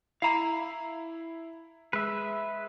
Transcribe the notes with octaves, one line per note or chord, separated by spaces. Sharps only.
E4 F5 A#5 B5
G#3 B4 E5